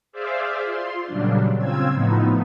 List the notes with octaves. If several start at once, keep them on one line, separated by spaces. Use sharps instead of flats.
G#4 C5 D5 E5 F5
F4 C6
A#2 C#3 F#3 G3 D4
C#3 C4 F4 E6 G#6
A2 F3 B3 D#4